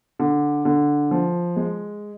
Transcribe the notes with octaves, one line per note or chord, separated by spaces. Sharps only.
D3
D3
F3
G#3